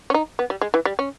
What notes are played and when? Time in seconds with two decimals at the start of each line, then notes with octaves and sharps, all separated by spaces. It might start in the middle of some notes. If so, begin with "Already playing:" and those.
0.10 C#4
0.14 D#4
0.39 B3
0.50 G3
0.61 G#3
0.74 E3
0.85 G3
0.99 C#4